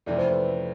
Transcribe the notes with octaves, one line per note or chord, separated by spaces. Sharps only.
F2 C3 E3 A3 D5
C5
B4
B4